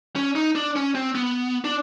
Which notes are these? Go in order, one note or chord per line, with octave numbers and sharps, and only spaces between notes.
C#4
D#4
D4
C#4
C4
B3
D4